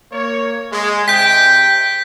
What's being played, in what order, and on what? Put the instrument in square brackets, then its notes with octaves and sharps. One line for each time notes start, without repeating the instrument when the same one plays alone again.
[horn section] A#3 C#5
G#3
[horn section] C3 G5 [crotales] G6 B6